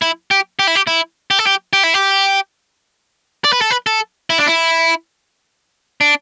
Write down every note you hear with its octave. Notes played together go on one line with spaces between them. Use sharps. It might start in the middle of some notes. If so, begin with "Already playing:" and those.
E4
G4
G4
E4
G4
E4
G4
A4
G4
G4
E4
G4
D5
B4
A4
B4
A4
E4
D4
E4
D4